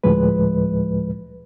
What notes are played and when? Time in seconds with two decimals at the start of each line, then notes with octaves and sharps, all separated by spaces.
0.04 D2 A2 F3 G#3 B4